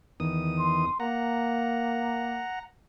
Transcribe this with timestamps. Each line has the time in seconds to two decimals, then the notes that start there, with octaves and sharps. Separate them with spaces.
0.20 E2 D#3 D#6
0.59 C6
1.00 A#3 F#5 A#5